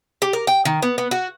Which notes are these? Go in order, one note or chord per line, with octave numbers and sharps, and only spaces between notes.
G4
A#4
G5
D#3
B3
B3
F#4